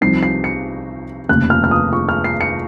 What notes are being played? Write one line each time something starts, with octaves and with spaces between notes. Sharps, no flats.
C2 C3 F3 C4 D#4 C7
C7
C#7
F1 D#2 C#3 F#6
F6
F6
D#6
C#6
F6
C7
C#7